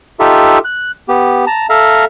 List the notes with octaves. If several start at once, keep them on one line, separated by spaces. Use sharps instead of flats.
D#4 F4 G4 A4 E5
F#6
B3 G4
A5 A#5
A4 E5 F5 A#5